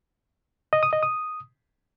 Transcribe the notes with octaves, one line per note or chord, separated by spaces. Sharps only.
D#5
D#6
D#5
D#6